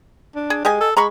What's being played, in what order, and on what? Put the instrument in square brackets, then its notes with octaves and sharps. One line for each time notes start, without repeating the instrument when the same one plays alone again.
[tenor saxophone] D4
[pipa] G#4
[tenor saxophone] G#3 [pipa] G4 D#5 G#5
[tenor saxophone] A4
[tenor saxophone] G#3 [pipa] A#5 B5 C#6